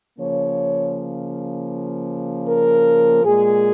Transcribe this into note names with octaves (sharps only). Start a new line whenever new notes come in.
C#3 F3 A#3 C#5
A#4
A#2 G#3 G#4